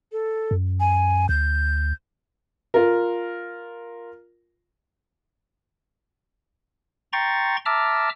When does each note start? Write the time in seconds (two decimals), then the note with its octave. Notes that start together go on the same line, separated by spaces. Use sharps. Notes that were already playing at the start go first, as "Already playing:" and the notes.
0.12 A4
0.51 F#2
0.80 G#5
1.29 D2 G6
2.74 F4 A#4
7.13 G5 A#5 C6 C#6 A6
7.66 E5 A5 A#5 D6 E6 F6